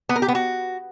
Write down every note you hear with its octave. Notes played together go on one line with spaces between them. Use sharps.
B3
A#4
G4
B3
F#4